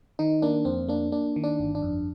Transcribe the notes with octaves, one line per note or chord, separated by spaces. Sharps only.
D#3 D#4
A#3 D4
F2 C4
A#3 D4
A#3 D4
D#3
D4
G1
D4
F2